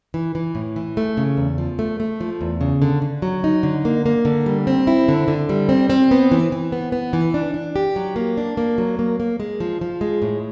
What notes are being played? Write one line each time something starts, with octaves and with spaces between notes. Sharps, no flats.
E3
E3
A2
E3
A3
C#3
E2
F3
A3
A3
F3
E2
C#3
D3
D3
F#3
D#4
D3
A#3
A#3
D3
G3
C4
E4
D3
D3
G3
C4
C4
B3
E3
E3
B3
B3
E3
D4
D4
G4
F#3
A#3
D4
A#3
F#3
A#3
A#3
G#3
F3
F3
G#3
A2